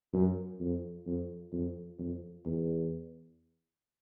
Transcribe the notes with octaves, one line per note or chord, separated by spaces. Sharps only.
F#2
F2
F2
F2
F2
E2